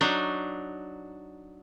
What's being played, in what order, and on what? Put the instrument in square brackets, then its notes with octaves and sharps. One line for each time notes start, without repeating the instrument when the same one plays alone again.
[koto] F#3 D4 D#4